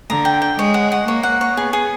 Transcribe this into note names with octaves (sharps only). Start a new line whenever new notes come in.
D3 A#5
G5
G5
G#3 C#5
F#5
F#5
A#3 C#5
F#5
C#5
B3 G#4
G#4